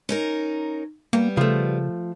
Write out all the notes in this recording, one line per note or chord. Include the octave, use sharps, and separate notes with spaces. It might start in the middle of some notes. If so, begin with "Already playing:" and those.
C#4 D#4 A#4
G3 A#3 B3
C#3 F3 A3